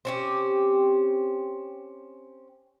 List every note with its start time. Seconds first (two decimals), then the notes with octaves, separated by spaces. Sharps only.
0.05 C4 C#4 G4